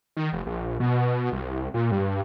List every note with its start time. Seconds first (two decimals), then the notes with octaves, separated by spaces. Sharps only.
0.17 D#3
0.32 F1
0.46 A#1
0.80 B2
1.32 C2
1.74 A#2
1.91 G2